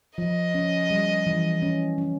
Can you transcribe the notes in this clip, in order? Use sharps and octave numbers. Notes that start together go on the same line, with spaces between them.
F3 D#5
C#4
G3
E3
C#4
C#4